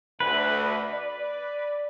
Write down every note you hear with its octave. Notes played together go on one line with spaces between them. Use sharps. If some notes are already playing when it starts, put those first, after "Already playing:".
D2 B4
D5